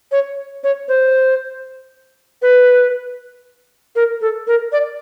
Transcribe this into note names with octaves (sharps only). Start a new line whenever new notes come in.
C#5
C#5
C5
B4
A#4
A4
A#4
D5